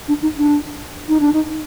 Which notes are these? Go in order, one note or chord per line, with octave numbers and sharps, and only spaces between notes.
D4
D#4
D4
D#4
D4
D#4